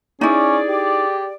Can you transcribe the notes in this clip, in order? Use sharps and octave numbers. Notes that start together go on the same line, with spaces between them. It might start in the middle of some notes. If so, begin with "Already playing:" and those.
C#4 D#4 E4 G#4 D5
G4